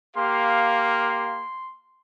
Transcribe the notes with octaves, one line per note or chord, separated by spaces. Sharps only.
A#3 G4 F5 C6